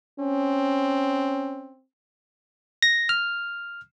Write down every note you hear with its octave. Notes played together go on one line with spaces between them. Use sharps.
C4 C#4
A#6
F6